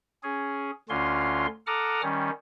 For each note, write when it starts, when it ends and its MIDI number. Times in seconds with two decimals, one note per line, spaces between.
0.23 0.71 61
0.23 0.71 68
0.89 1.47 38
0.89 1.47 50
0.89 1.47 61
0.89 1.47 65
0.89 1.47 84
1.67 2.01 69
1.67 2.01 78
1.67 2.01 82
1.67 2.01 86
1.67 2.01 87
1.67 2.01 89
2.02 2.30 51
2.02 2.30 55
2.02 2.30 61